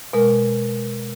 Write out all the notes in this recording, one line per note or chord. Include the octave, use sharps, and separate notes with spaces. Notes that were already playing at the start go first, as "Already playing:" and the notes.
B2 G#3 A#4